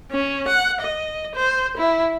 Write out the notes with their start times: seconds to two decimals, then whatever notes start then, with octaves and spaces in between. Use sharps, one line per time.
0.11 C#4
0.48 F#5
0.81 D#5
1.35 C5
1.77 E4